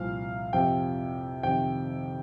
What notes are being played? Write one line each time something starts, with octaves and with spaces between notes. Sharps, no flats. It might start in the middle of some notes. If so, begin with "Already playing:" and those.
Already playing: C2 A#2 F3 F5
F2 C3 F3 G5
F2 C3 D#3 G5